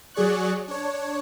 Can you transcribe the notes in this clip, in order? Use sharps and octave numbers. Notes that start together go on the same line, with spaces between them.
F#3 G#4 D5 C#6 F#6
D4 C#5